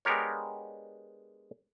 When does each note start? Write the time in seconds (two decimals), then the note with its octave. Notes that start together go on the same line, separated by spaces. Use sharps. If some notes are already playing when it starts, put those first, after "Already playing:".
0.05 G#3 B3 D4 G4 A#4 C#5